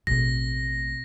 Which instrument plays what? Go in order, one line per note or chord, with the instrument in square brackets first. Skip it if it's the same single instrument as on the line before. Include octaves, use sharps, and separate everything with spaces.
[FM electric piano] A1 A3 [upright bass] B2 C4 [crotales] A#6